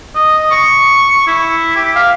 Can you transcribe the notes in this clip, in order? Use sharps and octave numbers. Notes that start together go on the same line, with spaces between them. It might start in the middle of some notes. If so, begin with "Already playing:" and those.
D#5
C#6
E4
G4
F5